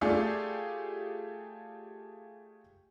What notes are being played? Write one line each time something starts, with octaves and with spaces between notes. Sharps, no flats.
A3 F4 G4 G#4 D5